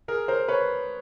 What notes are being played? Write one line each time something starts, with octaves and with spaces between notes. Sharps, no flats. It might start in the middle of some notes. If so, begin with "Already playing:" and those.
G#4 A#4
A#4 C5
B4 C#5